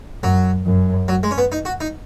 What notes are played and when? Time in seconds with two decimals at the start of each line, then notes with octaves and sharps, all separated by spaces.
0.23 F#2 F#3
0.66 F#2
1.08 F#3
1.23 G#3
1.31 C#4
1.38 B3
1.52 D#4
1.65 F#4
1.81 D#4